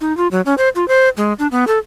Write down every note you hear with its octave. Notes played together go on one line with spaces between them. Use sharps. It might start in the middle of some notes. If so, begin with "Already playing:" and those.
D#4
F4
F#3
C#4
C5
F4
C5
G#3
D4
B3
A4